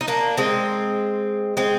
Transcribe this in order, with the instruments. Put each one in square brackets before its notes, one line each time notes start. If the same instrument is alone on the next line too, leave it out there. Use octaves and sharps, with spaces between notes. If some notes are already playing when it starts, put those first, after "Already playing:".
[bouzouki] D#4
A#3 D4
G#3 C4
G#3 C4